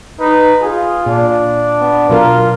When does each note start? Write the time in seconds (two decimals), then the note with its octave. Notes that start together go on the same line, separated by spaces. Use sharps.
0.20 D#4 B4
0.61 F4 G#4
1.06 A#2 D4
1.80 B3
2.10 B2 F#3 F4 A#4